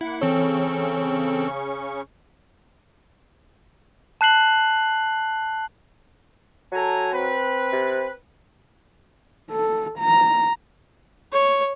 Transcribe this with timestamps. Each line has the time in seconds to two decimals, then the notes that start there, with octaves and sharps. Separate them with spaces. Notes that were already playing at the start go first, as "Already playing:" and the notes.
0.01 A#3 E4 F#5
0.22 C#3 E3 C4 C#4 A4 C#5 C#6
4.21 A5 F#6 C7 F#7
6.72 F#3 A4 G#5 A#5
7.11 C4 B4
7.73 C3
9.51 A4
9.99 A#5
11.33 C#5